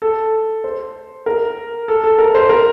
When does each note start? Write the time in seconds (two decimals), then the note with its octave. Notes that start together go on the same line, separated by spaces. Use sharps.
0.02 A4
0.64 C5
1.26 A#4
1.88 A4
2.04 A4
2.19 A#4
2.35 C5
2.49 A#4